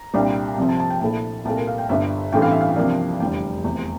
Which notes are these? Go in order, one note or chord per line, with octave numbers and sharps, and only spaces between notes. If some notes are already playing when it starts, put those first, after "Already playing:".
Already playing: A#5
C2 A#2 G3 D4
C2 C3 F3 C4
A5
A5
G5
A#1 A#2 A3 E4 A5
C2 A#2 A3 A5
A#4
F5
G5
G1 G2 D3 E5
A1 G2 E3 A3 C4 G5
F5
E5
F5
C2 C3 F3 A#3 D4
F1 E2 D3 G3 G5
F1 E2 C3